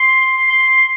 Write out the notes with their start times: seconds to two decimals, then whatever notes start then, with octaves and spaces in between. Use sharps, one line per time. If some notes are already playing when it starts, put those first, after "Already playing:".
Already playing: C6
0.49 C6